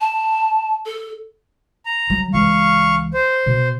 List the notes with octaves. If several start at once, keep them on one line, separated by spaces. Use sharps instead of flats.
A5
A4
A#5
F#3
C#2 E3 F5 C#6
C5
B2